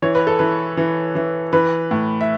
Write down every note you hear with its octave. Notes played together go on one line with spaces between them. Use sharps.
E3 C#5
B4
A4
E3 B4
E3
E3
E3 B4
A2
E5